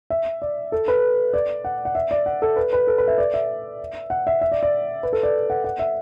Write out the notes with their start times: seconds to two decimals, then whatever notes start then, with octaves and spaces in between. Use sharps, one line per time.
0.10 E5
0.42 D5
0.72 A4
0.88 B4
1.33 D5
1.65 F#5
1.85 F#5
1.95 E5
2.11 D5
2.26 F#5
2.42 A4
2.56 B4
2.73 B4
2.87 A4
2.98 B4
3.08 E5
3.18 D5
3.34 E5
4.10 F#5
4.27 E5
4.41 E5
4.52 D5
4.63 D5
5.03 B4
5.13 A4
5.23 D5
5.50 F#5
5.64 F#5
5.79 E5